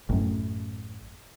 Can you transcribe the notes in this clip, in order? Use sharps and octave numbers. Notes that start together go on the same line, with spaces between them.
A1 F#2